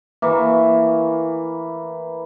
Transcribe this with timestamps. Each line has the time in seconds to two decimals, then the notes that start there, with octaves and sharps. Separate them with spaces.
0.22 E3 A#3 C#6